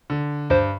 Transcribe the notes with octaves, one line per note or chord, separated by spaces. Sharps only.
D3
G2 C5